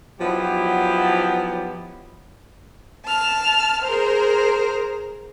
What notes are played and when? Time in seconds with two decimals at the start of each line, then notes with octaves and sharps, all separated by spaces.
0.20 F3 F#3 B3 D#4 E4 G4
3.06 A5 F6
3.83 G#4 A#4 C5